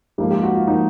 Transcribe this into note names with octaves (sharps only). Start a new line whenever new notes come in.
G#2 F3 A#3 G4
G4
F#4
F4
F3 A#3 D#4